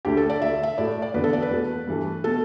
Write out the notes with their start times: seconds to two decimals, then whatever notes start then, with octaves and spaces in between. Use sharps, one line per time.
0.05 D2 D3 A3 G4
0.17 A4
0.30 D5
0.41 D2 D3 A3 E5
0.63 E5
0.78 A2 A3 D5
1.02 D5
1.14 E2 D3 B3 B4
1.24 A4
1.33 D5
1.42 B4
1.51 E2 B2 A3
1.87 G2 E3 A3
2.24 B2 A3 A4